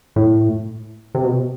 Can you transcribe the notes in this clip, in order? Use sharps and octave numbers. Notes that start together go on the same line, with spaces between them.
A2
C3
B2